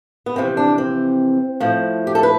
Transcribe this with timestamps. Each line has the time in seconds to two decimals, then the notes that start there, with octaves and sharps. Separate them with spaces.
0.26 B3
0.36 F2 C3 E3 C4
0.57 D4
0.78 C4
1.60 A2 F3
2.07 G4
2.15 A4
2.23 B4